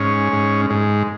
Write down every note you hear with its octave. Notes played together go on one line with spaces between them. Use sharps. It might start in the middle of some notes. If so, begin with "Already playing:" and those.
Already playing: G#2 C#4
G#2
G#2